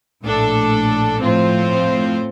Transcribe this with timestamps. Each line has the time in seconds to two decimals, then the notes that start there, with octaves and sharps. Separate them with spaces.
0.22 A#1 A2 A3 D4 A4
1.19 A2 F3 C4 F4 C5